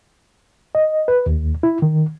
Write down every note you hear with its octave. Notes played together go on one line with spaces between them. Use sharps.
D#5
B4
D#2
E4
D#3